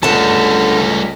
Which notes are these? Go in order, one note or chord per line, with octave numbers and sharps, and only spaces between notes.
C#2 D3 G3 A3 A5